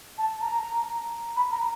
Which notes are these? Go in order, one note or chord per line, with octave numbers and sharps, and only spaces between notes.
A5
A#5
B5
A#5